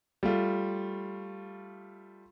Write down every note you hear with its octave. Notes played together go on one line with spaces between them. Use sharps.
G3 A3 F4